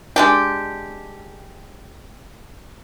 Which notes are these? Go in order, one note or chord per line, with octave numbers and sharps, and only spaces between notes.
G#3 D4 G4